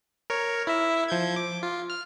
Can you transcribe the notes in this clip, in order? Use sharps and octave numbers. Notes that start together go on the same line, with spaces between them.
A#4 C#5
E4 E5
F3 G6 G#6
D6
F4
F6